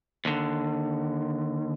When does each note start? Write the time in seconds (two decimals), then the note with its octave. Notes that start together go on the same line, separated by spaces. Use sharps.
0.25 D#2 D3